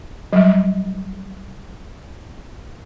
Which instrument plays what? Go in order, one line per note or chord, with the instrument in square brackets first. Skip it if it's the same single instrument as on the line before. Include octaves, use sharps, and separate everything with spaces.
[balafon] F#3 G3